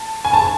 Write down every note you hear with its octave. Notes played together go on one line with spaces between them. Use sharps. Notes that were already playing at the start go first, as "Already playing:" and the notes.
Already playing: A5
G#5
A5